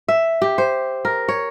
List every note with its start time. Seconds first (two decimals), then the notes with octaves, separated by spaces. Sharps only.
0.08 E5
0.42 G4
0.58 C5
1.05 A#4
1.29 C#5